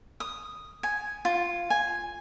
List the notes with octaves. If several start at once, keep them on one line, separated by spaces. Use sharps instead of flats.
D#6
G#5
F4
G#5